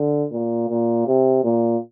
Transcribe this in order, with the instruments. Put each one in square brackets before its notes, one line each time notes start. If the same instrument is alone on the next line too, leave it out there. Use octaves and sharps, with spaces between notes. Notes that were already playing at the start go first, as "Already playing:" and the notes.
Already playing: [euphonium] D3
A#2
A#2
C3
A#2